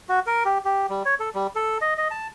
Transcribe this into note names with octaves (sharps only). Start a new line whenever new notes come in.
F#4
A#4
G4
G4
G3
C#5
A4
G3
A4
D#5
D#5
A5